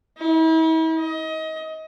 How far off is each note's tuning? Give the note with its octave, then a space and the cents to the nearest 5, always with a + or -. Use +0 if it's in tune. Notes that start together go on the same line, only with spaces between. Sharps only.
E4 -40
D#5 +25